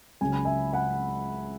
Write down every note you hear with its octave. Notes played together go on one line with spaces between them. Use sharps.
C#2 C#3 F#3 G#5
B5
E5 G#5
F#5 B5